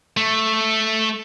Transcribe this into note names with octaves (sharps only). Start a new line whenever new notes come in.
A3